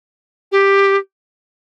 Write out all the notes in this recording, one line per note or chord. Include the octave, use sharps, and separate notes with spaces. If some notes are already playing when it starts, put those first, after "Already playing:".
G4